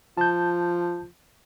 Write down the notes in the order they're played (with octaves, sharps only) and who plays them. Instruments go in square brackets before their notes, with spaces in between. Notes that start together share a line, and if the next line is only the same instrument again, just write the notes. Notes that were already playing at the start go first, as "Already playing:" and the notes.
[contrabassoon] F3 [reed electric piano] A5 G6